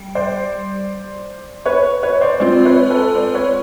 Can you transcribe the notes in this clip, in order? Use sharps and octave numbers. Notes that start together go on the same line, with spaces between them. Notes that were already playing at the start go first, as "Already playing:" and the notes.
Already playing: G3
C5 D5
B4 C#5
B4 C#5
C5 D5
G#3 C4 F4 C5 D5
B4 C#5
A4 B4
C5 D5
B4 C#5